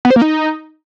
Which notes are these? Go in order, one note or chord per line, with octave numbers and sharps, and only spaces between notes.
B3
C5
A#3
D#4